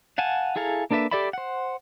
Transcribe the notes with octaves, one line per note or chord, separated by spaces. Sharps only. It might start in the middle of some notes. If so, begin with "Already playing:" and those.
F5 F#5 G#5 A5
E4 G#4 A4 F5 A#5
A#3 D4 A4 B4 E5
G4 A4 D5 E5 B5
C5 F#5